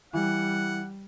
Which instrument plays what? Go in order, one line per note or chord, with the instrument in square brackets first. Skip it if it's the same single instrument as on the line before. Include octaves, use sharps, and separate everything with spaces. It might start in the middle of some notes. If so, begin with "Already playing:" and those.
[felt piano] E3 [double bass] G3 [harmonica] F#5